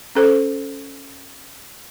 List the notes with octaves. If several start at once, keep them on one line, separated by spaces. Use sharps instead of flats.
C#4 A4 C5